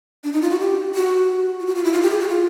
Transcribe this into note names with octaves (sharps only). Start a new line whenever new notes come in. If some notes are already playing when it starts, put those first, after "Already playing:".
D4
D#4
F4
F#4
G4
F#4
F4
F#4
F4
E4
F4
G4
G#4
F#4
F4